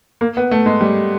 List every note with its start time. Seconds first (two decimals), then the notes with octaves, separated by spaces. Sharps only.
0.21 A#3
0.37 B3
0.51 A3
0.66 G#3
0.81 G3